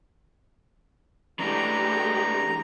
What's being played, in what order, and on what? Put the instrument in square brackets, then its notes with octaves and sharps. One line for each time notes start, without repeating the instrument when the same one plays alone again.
[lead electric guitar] E3 D4 [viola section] G#3 A3 G4 [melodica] A#5